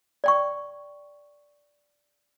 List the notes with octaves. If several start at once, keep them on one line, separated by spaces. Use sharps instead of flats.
D5 G5 C#6